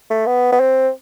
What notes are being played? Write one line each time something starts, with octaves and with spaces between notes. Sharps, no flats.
A3
B3
B3
C4